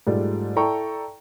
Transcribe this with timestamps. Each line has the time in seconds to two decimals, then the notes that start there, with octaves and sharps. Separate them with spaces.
0.07 G#2 G3 A3 F4 D5
0.56 E4 A4 D5 G5 A#5 C#6